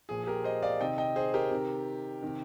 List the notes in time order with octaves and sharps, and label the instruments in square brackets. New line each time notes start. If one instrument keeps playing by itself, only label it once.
[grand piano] A#2 F3 G#4
G#4
G4 A#4
C5 D#5
D5 F5
C3 D#3 D#5 G5
D#5 G5
G#4 C5
G4 A#4
C3 D#3
C3 D#3